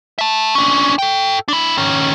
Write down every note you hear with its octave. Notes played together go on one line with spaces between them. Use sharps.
E5 A5
C#4 D4
A4 G5
D4 E4
D#3 C#4